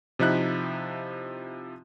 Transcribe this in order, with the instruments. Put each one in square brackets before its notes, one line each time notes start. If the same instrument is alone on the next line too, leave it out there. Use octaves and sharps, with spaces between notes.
[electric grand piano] C3 F3 D#4 E4 F#6